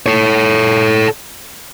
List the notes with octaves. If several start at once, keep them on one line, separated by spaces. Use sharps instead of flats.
A4 C#5